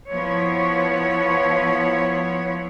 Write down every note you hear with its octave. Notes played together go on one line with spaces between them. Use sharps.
F3 B3 E4 C#5